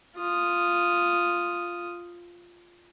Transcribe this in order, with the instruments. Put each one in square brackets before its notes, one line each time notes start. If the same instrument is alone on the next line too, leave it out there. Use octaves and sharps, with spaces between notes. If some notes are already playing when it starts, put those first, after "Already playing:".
[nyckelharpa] F4 D#6